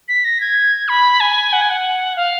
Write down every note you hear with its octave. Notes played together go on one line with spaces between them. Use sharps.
B6
A#6
G#6
B5
G#5
F#5
G#5
F#5
F5